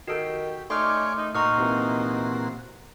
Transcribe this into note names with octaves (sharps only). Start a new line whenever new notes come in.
D#3 F#4 G4 A4
A3 D#4 C#5 D5 G#5 C6 D6 F6
D#4
A#2 D#4 F#4 C5 A#5 C#6 F6
C3 E3 A#3